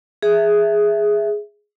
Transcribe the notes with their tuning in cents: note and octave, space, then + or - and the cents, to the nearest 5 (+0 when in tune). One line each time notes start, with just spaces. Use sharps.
G#4 +0 E5 +0